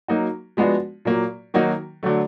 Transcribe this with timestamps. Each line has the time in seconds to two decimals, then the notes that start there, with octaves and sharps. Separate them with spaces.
0.08 F#3 A#3 D#4 F#4
0.57 F3 G#3 B3 D4 F#4
1.05 A#2 F#3 A#3
1.54 D#3 F#3 A#3 D#4 F#4
2.03 D3 F#3 A3